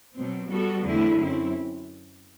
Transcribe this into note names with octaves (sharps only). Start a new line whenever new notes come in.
B2 F#3 C4
G3 B3 F#4 A4
E2 D3 A3 C4 E4
F#2 F#3 C4 E4